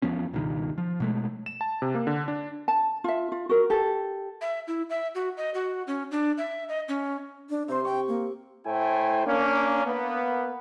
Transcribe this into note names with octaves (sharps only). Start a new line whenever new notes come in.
E2 F3 B3 C#4
C#2 G2 B2 D#3
F3
B2 G#3 A3
E7
A5
C3
A#3
D3
D4
A5
F4 E5
F4
F#4 A#4
G4 A4
E5
E4
E5
F#4
D#5
F#4
C#4
D4
E5
D#5
C#4
D4
C3 C5 C6
G5 C#6
A#3
A2 A3 E4 C5 G5 G#5
A#3 C#4 D4
A#3 B3